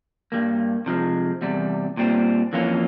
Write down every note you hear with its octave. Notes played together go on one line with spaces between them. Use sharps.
G2 G3 A#3
C3 F3 G#3
E2 C3 G3
A#2 G3 C4
F2 E3 A#3 C#4 F4